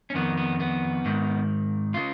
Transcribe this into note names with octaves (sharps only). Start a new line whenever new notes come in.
C#4
F2 D#3 B3
B3
B3
G#2 D#3
C#3 F4